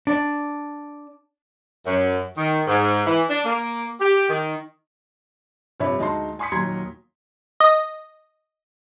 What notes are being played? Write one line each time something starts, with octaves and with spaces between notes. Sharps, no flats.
D4
F#2
D#3
G#2
E3
D4
A#3
G4
D#3
G2 C3 F3 C#5 E5 B5
D2 G#3 D#4 F#4 A5 C6
G#5 C6 C#6 D#6 B6 C#7
D#2 A#2 F#3 A#5 C6 G#6
D#5